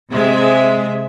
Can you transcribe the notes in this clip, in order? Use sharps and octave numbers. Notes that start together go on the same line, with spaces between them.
C3 G#3 E5